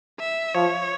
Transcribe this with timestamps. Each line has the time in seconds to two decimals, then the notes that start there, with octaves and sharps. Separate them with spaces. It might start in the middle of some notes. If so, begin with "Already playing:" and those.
0.20 E5
0.55 F3 C#5